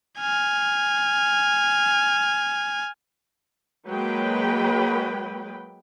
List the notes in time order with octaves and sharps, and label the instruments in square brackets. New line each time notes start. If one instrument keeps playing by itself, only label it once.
[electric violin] G#5 F6
[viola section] F#3 G#3 A#3 B4 G5 B5